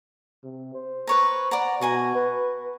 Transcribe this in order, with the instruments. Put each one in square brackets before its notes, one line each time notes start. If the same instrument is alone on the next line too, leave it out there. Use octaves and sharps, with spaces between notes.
[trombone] C3
C5
[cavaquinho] B4 C#5 A#5
D5 F#5 A#5
[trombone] B2 [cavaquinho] F#4 G#5 A#5
[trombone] B4